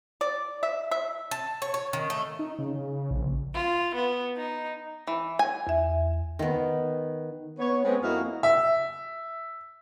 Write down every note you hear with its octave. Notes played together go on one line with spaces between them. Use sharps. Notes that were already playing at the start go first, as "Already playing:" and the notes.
D5
E5
E5
A5
C#5
C#5
D#3
A3
D#4
C#3
C#3
A#1
F4
B3
D#4
E3
G#5
E2 E5
D#3 B3
B3 C#5
G#3 B3 C4
F2 A#3 E4 F#4 D#5 F5
E5